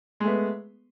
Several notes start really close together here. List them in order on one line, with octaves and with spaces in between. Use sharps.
G#3 A3 B3